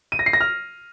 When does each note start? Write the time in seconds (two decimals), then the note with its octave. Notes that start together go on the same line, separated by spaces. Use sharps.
0.12 D#7
0.19 A#6
0.26 C7
0.33 A#6
0.41 F6